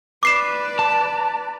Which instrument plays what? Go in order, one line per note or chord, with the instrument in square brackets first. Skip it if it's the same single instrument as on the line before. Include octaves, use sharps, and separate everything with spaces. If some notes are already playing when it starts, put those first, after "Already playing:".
[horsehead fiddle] B4 D5 [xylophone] D6 C7 E7
[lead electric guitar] A5